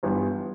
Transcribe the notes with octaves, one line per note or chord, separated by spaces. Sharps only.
G1 G2 E3 B3